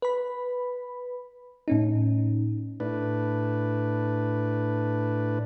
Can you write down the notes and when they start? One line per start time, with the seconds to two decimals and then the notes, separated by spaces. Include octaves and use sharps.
0.02 B4 B5
1.68 A2 C#4 D#4
2.80 A2 D4 B4